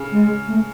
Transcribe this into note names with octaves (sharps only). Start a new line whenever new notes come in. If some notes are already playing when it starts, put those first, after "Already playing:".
Already playing: C#3
G#3
A3